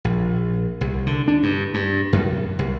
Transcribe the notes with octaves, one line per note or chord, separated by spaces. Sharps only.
A#1
C2
D3
D4
G2
G2
F#2
C2